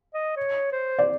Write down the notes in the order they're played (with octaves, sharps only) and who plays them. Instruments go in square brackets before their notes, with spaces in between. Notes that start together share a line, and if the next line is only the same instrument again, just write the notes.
[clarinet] D#5
C#5
C5
[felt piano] D5